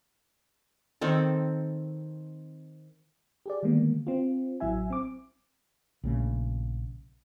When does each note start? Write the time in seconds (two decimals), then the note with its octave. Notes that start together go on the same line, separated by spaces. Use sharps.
1.01 D#3 C4 A4
3.46 G4 G#4 D5
3.63 D3 D#3 G3 G#3 A#3 B3
4.07 C4 F4
4.60 A1 F#3 E4 E5 G#5
4.90 C4 D6
6.03 A#1 C#3 A3